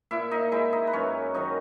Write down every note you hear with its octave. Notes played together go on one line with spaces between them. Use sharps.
A#2 E4 E5
D#4 D#5
G#3 E4 E5
D#4 D#5
B4
F#2 C#4 C#5
D#3 F#3 D#4 D#5